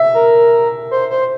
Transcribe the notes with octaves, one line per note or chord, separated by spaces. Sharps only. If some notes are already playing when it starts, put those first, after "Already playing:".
Already playing: E5
A#4
C5
C5